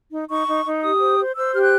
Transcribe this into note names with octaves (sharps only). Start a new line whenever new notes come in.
D#4
D#4 C#6
D#4
D#4
G4 D#6
C5
C5
C5 E6
G4 F6
F#6